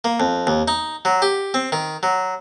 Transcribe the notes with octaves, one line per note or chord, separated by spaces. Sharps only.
A#3
F2
D#2
D#4
F#3
G4
C4
D#3
F#3